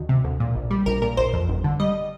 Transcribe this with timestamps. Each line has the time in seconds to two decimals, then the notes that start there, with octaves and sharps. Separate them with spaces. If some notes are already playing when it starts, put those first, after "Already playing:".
Already playing: D2 D#3
0.09 C3
0.24 D2
0.40 A#2
0.55 A#1
0.70 G3
0.86 A#1 A#4
1.02 A#2 A#4
1.17 A#1 C5
1.33 F2
1.49 G1
1.64 D3
1.80 G3 D#5